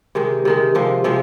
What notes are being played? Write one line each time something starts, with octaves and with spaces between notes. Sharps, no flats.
C3 D#3 G#3
C3 D#3 G#3
C3 F3 G#3
C3 F3 G#3